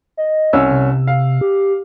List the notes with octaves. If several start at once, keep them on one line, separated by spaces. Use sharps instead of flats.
D#5
C2 C#4 E6
C3
F5
G4